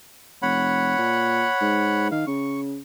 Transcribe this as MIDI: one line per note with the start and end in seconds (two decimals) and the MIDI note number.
0.42 0.96 29
0.42 2.08 73
0.42 2.08 78
0.42 2.08 83
0.98 1.46 46
1.61 2.11 44
2.11 2.23 51
2.11 2.26 77
2.27 2.80 49
2.27 2.61 85